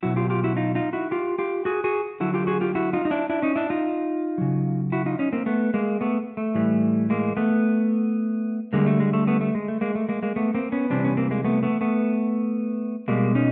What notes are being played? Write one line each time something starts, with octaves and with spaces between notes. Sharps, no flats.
B2 F#3 E4 F#4
F4 G4
F4 G4
E4 F#4
D#4 F4
D#4 F4
E4 F#4
F4 G4
F4 G4
F#4 G#4
F#4 G#4
D3 F#3 E4 F#4
F4 G4
F#4 G#4
F4 G4
E4 F#4
D#4 F4
D#4
D4 E4
D4 E4
C#4 D#4
D4 E4
D#4 F4
C#3 F#3
E4 F#4
D#4 F4
C#4 D#4
A#3 C4
A3 B3
G#3 A#3
A3 B3
A3
A2 E3 G3
G#3 A#3
A3 B3
D3 G3 G#3 A#3
A3
G#3
A3
A3 B3
A3
G#3
A3
G#3 A#3
A3
G#3 A#3
G#3 A#3
A3 B3
A#3 C4
B3 C#4
C3 E3 G3 C4 D4
B3 C#4
A#3 C4
G#3 A#3
A3 B3
A3 B3
A3 B3
B2 G3 G#3 A#3
C#4 D#4